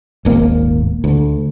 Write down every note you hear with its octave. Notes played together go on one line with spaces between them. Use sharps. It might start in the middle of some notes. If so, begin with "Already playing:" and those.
D#1 G#1 A#3
D2